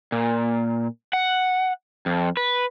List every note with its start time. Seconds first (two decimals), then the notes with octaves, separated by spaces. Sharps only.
0.12 A#2
1.13 F#5
2.06 F2
2.37 B4